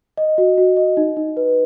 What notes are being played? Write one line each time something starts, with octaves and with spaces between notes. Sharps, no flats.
D#5
F#4
F#4
D#5
D#4
D#4
B4